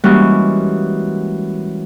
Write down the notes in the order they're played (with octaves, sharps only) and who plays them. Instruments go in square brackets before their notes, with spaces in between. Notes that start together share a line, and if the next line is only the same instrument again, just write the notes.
[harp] E3 G3 G#3 A#3 C#4 F#4